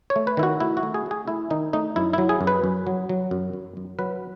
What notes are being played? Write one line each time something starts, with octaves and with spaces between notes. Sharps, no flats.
C#5
A3
B4
D#3 E4
F#4
A3 E4
F#4
A3
G#4
A3 G#4
A3 E4
D#3 D#4
A3 D#4
F#2 E4
F#3 E4
G#4
F#2
B4
F#2
F#3
F#3
F#2
F#2
F#2
F#3 B4